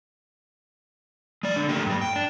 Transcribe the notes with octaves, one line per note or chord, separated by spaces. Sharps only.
G#3 D5
D3 D4
A3 A#3 G4
G2 G3
G5
D4